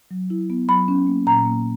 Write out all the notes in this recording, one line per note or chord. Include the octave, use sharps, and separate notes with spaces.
F#3
E4
B3
F#3 B5
C#4
A#3
A#2 A#5
A#3